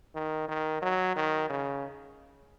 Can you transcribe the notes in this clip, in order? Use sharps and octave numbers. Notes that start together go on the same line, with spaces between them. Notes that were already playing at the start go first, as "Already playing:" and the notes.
D#3
D#3
F#3
D#3
C#3